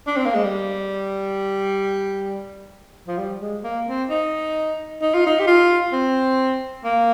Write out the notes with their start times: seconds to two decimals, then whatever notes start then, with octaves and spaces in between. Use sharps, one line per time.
0.07 D4
0.16 C4
0.26 A#3
0.35 G#3
0.44 G3
3.07 F3
3.18 G3
3.41 G#3
3.64 A#3
3.87 C4
4.10 D#4
5.02 D#4
5.14 F4
5.27 D#4
5.40 G4
5.47 F4
5.92 C4
6.84 A#3